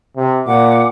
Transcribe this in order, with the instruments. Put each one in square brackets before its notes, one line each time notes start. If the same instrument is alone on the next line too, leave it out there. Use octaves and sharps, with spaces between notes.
[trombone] C3
[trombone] A#2 [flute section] F#5 D6